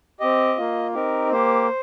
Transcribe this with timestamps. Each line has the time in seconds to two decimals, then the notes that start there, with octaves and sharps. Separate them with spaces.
0.20 C4 G4 D#5
0.57 A#3 F4
0.94 C4 D#4 G4 A#4
1.32 A#3 G4 C5